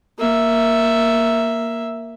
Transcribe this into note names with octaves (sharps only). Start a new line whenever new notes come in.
A#3 E5